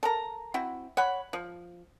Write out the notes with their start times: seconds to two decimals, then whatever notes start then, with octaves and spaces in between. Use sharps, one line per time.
0.03 A4 A#4 A#5
0.54 C4 E4 F#4
0.97 C#5 F#5 B5
1.33 F3